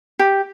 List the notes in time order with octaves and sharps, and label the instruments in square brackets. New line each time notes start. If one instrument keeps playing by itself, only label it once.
[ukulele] G4